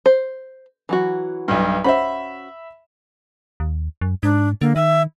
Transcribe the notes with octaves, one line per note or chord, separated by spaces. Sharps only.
C5
E3 F#3 F#4
B1 G2
C#4 F#4 C5 E5 B5
D#2
F#2
G#2 D4
D3 A#3
D#3 E5